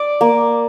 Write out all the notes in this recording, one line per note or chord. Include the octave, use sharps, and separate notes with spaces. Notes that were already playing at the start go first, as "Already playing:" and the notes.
Already playing: D5 D6
A#3